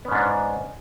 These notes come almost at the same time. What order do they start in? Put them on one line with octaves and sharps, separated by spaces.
B3 C#4 G#2 D4